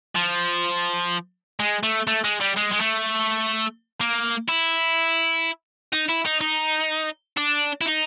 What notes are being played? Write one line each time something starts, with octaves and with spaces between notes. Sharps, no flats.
F3
G#3
A3
A3
G#3
G3
G#3
G#3
A3
A#3
E4
D#4
E4
D#4
D#4
D4
E4
D#4